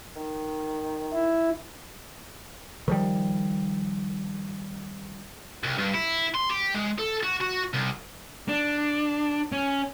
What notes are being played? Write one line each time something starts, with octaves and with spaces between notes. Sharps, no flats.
D#3
E4
D#3 F3 G3
C2
G2
E4
C6
G4
G#3
A4
F#4
F#4
C2
D4
C#4